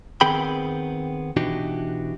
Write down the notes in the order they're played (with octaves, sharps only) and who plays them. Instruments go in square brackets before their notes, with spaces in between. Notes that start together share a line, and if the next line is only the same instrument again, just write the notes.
[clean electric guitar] D#3 B3 C4 G#4 G5 B5
B2 E3 D4 D#4 F#4 G4